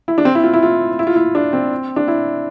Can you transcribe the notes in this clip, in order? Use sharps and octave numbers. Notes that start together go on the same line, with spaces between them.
E4
D4
C4
E4
F4
E4
F4
E4
F4
E4
D4
C4
D4
E4